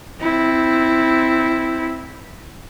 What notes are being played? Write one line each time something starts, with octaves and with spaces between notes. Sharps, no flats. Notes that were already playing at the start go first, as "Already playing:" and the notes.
C4 E4